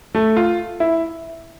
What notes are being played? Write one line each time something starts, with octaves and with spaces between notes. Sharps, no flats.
A3
F4
E4